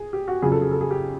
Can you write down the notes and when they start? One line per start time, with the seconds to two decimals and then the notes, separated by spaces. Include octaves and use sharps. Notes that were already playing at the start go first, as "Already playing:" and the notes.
Already playing: G#4
0.13 G4
0.28 F#4
0.42 F2 C#3 F#3 G#4
0.52 A4
0.62 G#4
0.71 A4
0.81 G#4
0.91 G4